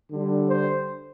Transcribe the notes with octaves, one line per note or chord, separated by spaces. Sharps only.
D3 G3
C5